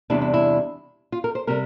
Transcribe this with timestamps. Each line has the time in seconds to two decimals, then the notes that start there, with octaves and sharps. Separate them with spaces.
0.10 E2 C3 G3 D4 E4
0.21 E4
0.34 E4
1.12 F4
1.24 A#4
1.35 C5
1.47 C3 G3 A#4